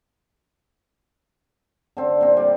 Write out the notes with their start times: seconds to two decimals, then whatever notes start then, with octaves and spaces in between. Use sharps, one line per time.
1.97 D3 C4
2.21 A#2 C4
2.37 G3 D5